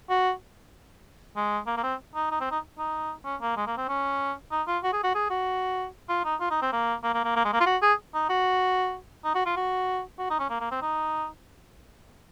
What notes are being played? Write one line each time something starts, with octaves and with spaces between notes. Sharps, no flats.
F#4
G#3
A#3
A#3
C4
D#4
D#4
C4
D#4
D#4
C#4
A#3
G#3
A#3
C4
C#4
D#4
F4
F#4
G#4
F#4
G#4
F#4
F4
D#4
F4
D#4
C4
A#3
A#3
A#3
A#3
A#3
G#3
A#3
F4
F#4
G#4
D#4
F#4
D#4
F#4
F4
F#4
F#4
D#4
C#4
A#3
A#3
C4
D#4